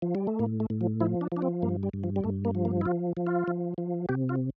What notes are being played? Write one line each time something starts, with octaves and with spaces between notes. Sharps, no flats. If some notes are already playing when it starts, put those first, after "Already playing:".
F3
G3
A3
A2 A#3
A3
A2
F3
F3 E4
D4
F3 D4
C4
G2 A#3
G3
G2
F3
G3
G2 A3
A#3
F3
A#3
E4
F3 F4
F3
F4
F3
F3
C3 G4
F4